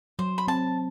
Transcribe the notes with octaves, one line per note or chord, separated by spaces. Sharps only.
F#3 C5
B5
C4 A5